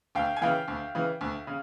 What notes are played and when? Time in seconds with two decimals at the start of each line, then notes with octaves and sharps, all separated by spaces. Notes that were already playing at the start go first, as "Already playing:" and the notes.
0.15 D2 F5 G5
0.36 G#5
0.41 C#3 E3 F5 G5
0.68 D2
0.95 C#3 E3
1.21 D2
1.47 C#3